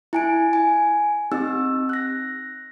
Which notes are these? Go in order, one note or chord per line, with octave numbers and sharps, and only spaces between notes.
E4 G#5 D7
G#5
C4 D#4 G4 E6
F#6 A#6